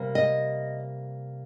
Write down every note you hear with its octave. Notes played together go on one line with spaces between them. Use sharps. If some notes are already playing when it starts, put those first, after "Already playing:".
Already playing: C3 G3 A#3
D#5